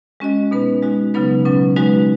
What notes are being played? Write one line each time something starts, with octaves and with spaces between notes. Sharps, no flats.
G#3 C#4 F#4 D#5
B2 B3 D#4 B4
G#3 D#4 F#4
C#3 F#3 B3 D#4 B4
B2 F#3 C#4 B4
G#3 D#4 F#4 B4